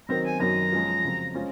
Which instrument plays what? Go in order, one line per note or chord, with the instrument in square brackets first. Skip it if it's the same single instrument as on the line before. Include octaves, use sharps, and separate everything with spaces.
[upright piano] D#3 F#3 C4 [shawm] A#5
[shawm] G#5
[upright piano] F#2 D#3 F#3 [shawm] A#5
[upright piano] F3 G#3 C#4
F2 C#3 F#3 C4
G#3 C#4 F4 C5